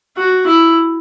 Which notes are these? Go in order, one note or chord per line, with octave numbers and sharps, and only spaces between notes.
F#4
E4